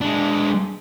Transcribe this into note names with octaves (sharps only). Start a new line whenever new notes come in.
G#3 D4